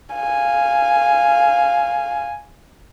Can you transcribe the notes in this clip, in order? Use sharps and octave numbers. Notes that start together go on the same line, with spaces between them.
F5 G#5